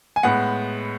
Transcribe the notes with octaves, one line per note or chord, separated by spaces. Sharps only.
G#5
A2 G#3 B3 F#5